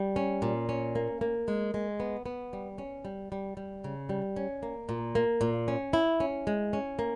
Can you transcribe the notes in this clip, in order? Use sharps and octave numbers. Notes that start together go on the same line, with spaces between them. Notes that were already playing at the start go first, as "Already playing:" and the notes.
Already playing: G3
C#4
A#2
C#4
A#3
A#3
G#3
G#3
B3
B3
G3
C#4
G3
G3
G3
C#3
G3
C#4
A#3
A#2
A#3
A#2
C#4
E4
C#4
G#3
C#4
A#3